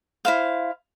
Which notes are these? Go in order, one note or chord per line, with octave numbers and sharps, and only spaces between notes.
E4 C5 F5